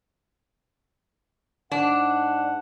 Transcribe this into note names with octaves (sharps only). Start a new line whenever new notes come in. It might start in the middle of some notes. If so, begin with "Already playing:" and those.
G#2 D4 F#5